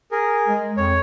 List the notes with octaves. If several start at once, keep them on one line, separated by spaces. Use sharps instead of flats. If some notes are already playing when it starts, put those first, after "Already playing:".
G#4 A#4
G#3
F2 C#5